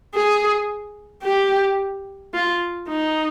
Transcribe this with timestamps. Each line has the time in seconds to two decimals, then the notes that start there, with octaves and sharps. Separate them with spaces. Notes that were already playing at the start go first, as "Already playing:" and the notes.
0.14 G#4
1.24 G4
2.34 F4
2.88 D#4